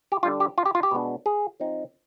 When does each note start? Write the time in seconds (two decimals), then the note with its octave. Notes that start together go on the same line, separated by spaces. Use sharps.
0.12 G4
0.23 D3 G3 D4 F4
0.40 G4
0.58 F4
0.66 G4
0.75 F4
0.83 G4
0.91 B2 G#3 B3 D4
1.26 G#4
1.60 F3 C4 D#4